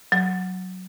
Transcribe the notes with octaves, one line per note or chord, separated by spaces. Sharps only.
F#3